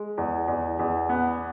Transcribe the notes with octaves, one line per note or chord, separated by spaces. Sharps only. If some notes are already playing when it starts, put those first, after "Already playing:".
Already playing: G#3
E2
E2
E2
B3